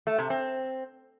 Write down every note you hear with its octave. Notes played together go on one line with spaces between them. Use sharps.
A3
C3
C4